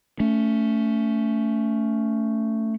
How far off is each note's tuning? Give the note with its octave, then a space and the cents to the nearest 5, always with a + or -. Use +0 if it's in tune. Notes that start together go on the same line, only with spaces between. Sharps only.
A3 +10 C#4 +25